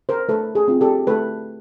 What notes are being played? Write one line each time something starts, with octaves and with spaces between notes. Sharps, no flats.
A#4 C5
A3 A4 B4
G#4
C4 F4
G4 A4
A3 A4 B4